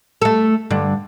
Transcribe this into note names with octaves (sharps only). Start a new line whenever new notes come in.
A3 A4
G2 D3